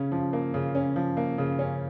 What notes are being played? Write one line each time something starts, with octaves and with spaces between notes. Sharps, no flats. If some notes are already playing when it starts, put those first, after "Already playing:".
Already playing: C#3 C#4
F3
A#3
C#3
C#4
F3
A#3
C#3
C#4